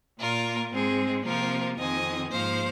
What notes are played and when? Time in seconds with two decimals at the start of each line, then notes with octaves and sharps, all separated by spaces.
0.20 A#2 A#3 F4 A#4
0.72 G#2 G#3 C4 G#4
1.26 C3 F3 A#3 F4 A#4
1.79 F2 D#3 C4 D#5 G#5
2.32 G#2 F3 A#3 C5 F5